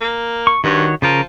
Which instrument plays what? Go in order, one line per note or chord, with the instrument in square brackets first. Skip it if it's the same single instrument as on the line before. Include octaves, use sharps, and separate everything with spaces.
[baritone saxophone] A#3
[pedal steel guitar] C#6
[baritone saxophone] G2 [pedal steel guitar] D#3 F#4 C#5
[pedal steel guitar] C#3 A#4 [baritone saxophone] F3